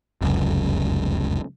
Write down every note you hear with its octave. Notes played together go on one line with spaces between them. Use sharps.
F1 C#2 F#2